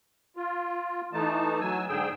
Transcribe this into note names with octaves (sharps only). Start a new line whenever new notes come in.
F4
E3 A3 D#4 A5
F#3 G#5 E6
G#2 D3 G#4 G5 E6